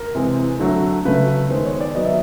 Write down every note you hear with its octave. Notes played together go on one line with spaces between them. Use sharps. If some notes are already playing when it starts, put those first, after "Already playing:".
Already playing: A#4
C3 E3 G#3
D3 F#3 A3
C#3 F#3 A3 B4
D#3 G#3 B3 C5
C#5
D5
D#3 F#3 B3 D#5
E5